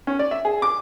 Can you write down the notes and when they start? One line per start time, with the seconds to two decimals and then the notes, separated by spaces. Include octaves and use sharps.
0.07 C#4
0.19 D5
0.31 E5
0.45 G#4
0.62 D6